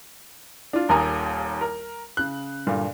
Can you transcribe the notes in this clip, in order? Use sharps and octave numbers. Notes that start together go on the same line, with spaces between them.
D4 F4
D#1 D#2 A#4 G#5 A#5 D#6
A#4
C#3 F#6
G2 A#2 D3